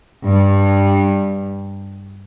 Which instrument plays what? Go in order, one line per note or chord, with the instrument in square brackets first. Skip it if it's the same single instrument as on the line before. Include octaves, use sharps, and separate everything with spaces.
[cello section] G2